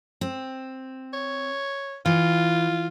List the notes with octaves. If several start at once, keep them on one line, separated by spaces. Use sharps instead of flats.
C4
C#5
E3 F4